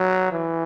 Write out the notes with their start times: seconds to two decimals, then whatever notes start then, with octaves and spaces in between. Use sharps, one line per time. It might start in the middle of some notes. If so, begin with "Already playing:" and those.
Already playing: F#3
0.32 E3